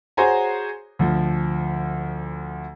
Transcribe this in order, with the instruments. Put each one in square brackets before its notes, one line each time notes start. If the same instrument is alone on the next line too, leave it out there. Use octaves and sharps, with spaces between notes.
[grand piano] F#4 G#4 C5 C#5 G#5 A#5
D2 F3